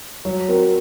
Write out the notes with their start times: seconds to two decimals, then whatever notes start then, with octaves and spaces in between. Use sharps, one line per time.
0.25 F#3
0.49 C4 F#4 A#4